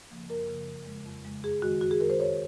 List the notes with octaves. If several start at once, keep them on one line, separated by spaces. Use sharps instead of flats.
C#3 F3 A#3
F#2 A#4
C#3 F3 A#3
F2
C#3 G#3
F2
C#3 G#3
F#2 G#4
D#3 G#3 F#4
F#2 F#4
G#4
D#3 G#3 A#4
C5
F2 C#5